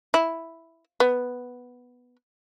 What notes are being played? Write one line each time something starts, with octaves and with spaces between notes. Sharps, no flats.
E4
B3